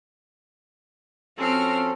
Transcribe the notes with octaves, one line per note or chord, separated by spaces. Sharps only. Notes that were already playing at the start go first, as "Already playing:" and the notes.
F3 C4 C#4 F#4 A4 F6